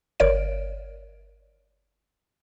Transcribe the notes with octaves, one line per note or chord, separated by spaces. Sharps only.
G1 A#4 C#5 D5 D7